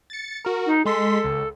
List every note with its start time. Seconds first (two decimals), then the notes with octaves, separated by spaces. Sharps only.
0.10 A6 C#7
0.45 F#4 A#4
0.66 D#4
0.85 G#3 A4 C6 B6
1.24 C#2